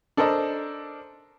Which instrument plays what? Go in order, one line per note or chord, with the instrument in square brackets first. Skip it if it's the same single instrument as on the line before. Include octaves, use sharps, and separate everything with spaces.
[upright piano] D4 A4 A#4 C5 D#5